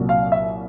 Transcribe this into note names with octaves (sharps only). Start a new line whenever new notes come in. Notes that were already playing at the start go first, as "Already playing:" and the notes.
Already playing: C2 A#2 F#3
F5
E5